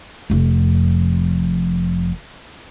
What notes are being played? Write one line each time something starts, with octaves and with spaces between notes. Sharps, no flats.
F1 F2